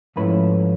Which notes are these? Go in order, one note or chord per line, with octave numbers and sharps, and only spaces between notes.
G#2 F3 A3 C#4 E4 B4 B5